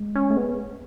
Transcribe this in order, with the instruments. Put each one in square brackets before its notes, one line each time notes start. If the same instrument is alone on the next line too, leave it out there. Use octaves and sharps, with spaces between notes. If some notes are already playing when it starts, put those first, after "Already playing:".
Already playing: [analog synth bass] G#3
[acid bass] C#4
[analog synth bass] A3
[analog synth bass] G#3 [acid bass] B3